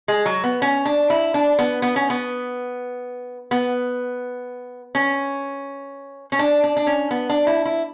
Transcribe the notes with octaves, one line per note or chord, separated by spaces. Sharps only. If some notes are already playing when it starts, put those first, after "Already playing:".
G#3
F#3
B3
C#4
D4
E4
D4
B3
B3
C#4
B3
B3
C#4
C#4
D4
D4
D4
C#4
B3
D4
E4
E4